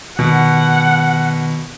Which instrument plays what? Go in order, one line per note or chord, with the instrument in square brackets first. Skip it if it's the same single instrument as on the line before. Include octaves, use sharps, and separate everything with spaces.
[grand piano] B2 [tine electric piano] D#3 [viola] F#5